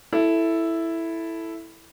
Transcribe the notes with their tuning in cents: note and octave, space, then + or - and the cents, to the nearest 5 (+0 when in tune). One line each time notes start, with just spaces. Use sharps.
E4 +0 A4 +0